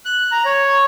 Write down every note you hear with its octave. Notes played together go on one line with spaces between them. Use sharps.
F#6
A#5
C#5